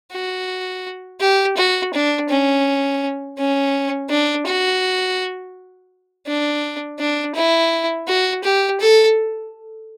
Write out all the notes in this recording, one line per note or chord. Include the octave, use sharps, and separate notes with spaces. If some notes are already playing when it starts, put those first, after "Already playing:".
F#4
G4
F#4
D4
C#4
C#4
D4
F#4
D4
D4
E4
F#4
G4
A4